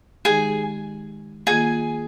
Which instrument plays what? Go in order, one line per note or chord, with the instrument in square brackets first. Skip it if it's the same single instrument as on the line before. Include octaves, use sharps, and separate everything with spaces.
[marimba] D#3 G#3 D#4 G4 [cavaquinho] G#4 G#5
[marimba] D#3 A#3 F4 [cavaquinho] G#4 G#5